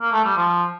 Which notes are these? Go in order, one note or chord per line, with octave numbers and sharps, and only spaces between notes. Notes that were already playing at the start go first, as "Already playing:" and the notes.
A#3
A3
G3
F3